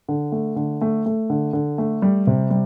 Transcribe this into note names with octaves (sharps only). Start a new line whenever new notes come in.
D3
A3
D3
A3
A3
D3
D3
A3
G3
C3
G3